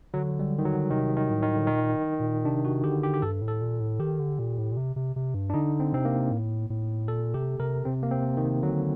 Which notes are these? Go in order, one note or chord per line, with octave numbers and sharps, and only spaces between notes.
D3 F#3
G3
D#3
F#3
C3 D#3
D#3
A2
D#3
D3
A#2 D#3
A#2
C3 D4
F#4
D3 G4
G4
G4
G2 A4
A2
A4
A#2
A2
D#3 G4
D3
A#2
A2
A#2
C3
C3
C3
G2
D4
D3 D#4
C4
C3 C4
A#3
A2
A2
A#2 A4
C3 G4
C3 A#4
C3 C4
A#3
C4
D#3
D3 F#3